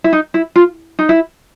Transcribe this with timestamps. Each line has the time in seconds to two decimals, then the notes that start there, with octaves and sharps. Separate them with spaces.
0.04 E4
0.13 D#4
0.34 E4
0.56 F4
0.99 D#4
1.09 E4